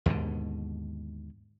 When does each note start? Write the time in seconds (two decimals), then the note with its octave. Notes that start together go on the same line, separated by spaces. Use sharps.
0.06 D#2 G#2 B2 D3